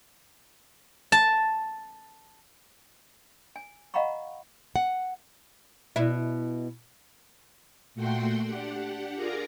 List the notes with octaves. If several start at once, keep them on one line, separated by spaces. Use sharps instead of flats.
A5
G#5
D#5 F5 F#5 A#5 B5 C#6
F#5
B2 E4
A#2 A3 F#4 F#5 G5 C6
D4 G4 F#5
F4 G#4 A#4 D5 A#5